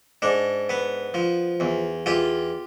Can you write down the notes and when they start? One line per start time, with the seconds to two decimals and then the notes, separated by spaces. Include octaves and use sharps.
0.22 G#2 D4
0.69 B3
1.14 F3
1.60 E2
2.06 E2 F4 G4